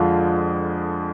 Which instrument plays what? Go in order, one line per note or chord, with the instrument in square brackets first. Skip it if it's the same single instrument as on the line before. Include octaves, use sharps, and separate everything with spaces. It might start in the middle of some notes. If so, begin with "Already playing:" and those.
Already playing: [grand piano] F2 D3 F3 G#3 D4 [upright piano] F4